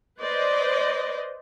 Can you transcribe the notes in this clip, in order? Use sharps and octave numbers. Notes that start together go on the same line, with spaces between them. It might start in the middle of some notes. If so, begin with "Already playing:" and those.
B4 C5 D5 D#5